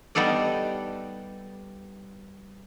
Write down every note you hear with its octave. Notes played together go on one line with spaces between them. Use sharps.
G3 B3 D#4 A4 D5